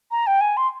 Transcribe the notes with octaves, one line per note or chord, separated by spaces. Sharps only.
A#5
G5
G#5
C6